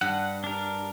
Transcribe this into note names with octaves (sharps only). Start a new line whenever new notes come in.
G2 F#5
D4 A#4